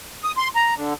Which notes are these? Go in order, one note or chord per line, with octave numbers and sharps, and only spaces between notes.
D#6
C6
A#5
D3